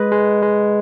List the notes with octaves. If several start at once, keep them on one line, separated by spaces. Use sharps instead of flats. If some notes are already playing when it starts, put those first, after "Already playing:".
Already playing: G#3 B4 D#5
G#3
G#3